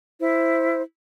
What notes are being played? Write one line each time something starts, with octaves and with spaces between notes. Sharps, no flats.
E4 C5